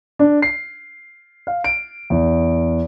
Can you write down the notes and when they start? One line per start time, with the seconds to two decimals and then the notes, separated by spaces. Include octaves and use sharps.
0.19 D4
0.42 C7
1.47 F5
1.64 D7
2.10 E2